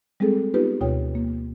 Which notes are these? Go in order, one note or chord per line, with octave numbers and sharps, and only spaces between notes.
G3 G#3 C4 G#4 A4
B3 D#4 F4 G4 B4
D2 B2 F4 C#5 G5
A#3